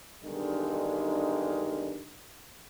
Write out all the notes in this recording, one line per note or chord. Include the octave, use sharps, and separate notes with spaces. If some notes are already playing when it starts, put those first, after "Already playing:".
B1 G2 D3 D#3 G#3 D#4